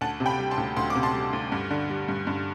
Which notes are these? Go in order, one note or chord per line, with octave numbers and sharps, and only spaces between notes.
D2 F#5 A5
C3
G5 B5
G3
A5 C6
D2
D2 C6
D6
C3
A5 C6
G3
D2
G2
D3
G3
G2
G2